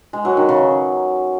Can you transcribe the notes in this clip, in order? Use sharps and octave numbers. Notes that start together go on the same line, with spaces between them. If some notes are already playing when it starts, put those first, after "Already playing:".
G#3
F#3
D#3
C#3